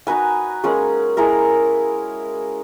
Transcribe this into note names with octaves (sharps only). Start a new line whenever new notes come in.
D#4 F#4 B4 G#5
G#3 A#3 C#4 G#4
G#3 E4 G#4 A#4